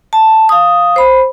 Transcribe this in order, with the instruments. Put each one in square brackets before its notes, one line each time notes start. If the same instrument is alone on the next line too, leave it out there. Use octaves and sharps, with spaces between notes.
[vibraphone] A5
F5 D#6
C5 B5